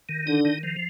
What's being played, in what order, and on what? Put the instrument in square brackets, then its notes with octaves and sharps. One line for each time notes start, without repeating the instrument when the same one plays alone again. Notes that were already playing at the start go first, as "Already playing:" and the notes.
[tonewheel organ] D#3
[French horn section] D3 [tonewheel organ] D#4
[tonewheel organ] D#3
F3